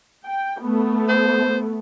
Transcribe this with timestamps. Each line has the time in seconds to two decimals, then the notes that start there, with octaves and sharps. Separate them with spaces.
0.24 G5
0.62 A3 B3
1.09 C5